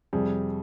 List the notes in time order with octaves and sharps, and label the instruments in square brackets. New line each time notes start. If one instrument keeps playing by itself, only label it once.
[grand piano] F2 C3 G3 G#4